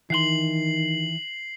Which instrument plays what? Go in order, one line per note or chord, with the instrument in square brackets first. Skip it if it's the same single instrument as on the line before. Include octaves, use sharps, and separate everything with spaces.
[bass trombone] D#3 [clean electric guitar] E3 F#5 C6 [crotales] C7 F#7